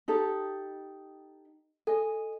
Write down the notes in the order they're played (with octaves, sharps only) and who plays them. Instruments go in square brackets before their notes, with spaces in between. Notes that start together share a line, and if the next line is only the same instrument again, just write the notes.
[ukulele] D#4 G4 A4
[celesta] A4 [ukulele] D#5 G#5